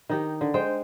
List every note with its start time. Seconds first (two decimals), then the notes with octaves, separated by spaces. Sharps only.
0.09 D#3 D#4 G4
0.41 D3
0.54 G#3 C5 G5